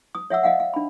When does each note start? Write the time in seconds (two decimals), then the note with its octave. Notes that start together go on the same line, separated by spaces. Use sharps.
0.15 D#6
0.30 C#5 E5 F#5 E6
0.43 D#5 F5 F#5
0.60 F5
0.74 D4 B5